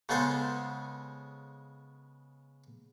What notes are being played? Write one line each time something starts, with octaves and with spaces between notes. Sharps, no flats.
C#3 G#3 B3 A4 C5